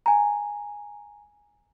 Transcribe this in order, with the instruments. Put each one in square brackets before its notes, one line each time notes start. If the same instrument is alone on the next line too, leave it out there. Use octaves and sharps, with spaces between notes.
[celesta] G#5 A#5